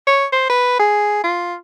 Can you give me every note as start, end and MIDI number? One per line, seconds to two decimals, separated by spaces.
0.07 0.26 73
0.32 0.45 72
0.50 0.76 71
0.79 1.19 68
1.24 1.55 65